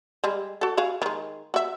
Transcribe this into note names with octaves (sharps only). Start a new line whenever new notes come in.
G3 G#3
F#4 A4
F#4 G#4 F5
D#3 G#3
F#4 E5